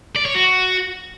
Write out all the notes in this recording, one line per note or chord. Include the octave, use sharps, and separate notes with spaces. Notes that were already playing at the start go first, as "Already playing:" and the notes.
D5
C#5
F#4